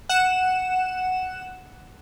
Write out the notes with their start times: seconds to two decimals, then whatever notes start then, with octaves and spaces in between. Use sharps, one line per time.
0.09 F#5 E7